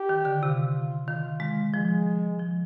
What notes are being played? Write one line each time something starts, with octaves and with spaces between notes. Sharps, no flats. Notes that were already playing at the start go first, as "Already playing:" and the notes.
Already playing: G4
D#3
D3
C3 F4
D#3 F4
G#3
F3 G#3
F3